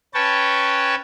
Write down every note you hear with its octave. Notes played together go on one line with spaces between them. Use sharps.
C#4 B4 C#5 G5 A5